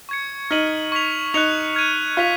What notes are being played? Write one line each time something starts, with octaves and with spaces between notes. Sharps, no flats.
C#6 G#6 C#7
D#4 F6 B6 D#7 F#7
C#6 G#6 B6 F7
D#4 F#6 C#7 F7
F6 G#6 D#7
F4 F6 B6 F7